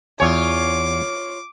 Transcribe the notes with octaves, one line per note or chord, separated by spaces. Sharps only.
E2 F4 C#5 G#5 D6